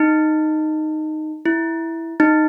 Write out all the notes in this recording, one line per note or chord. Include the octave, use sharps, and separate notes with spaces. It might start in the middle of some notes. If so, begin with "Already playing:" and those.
Already playing: D#4
E4
D#4